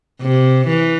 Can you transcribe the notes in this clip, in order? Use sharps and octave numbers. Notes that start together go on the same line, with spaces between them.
C3
E3